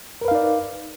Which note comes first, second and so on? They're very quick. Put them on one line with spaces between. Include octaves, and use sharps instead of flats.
A#4 B4 F5 D#4 D5